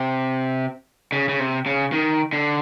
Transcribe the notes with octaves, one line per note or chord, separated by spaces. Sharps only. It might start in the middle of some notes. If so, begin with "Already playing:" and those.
Already playing: C3
C#3
C#3
C3
C#3
D#3
D3